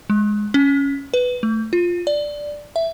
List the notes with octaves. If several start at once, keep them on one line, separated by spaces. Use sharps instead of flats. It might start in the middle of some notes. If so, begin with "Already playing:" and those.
G#3
C#4
B4
A3
F4
D5
E5